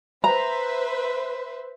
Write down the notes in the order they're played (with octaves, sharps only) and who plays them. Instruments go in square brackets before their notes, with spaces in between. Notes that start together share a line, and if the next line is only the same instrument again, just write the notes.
[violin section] B4 C5 E5 [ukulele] A#5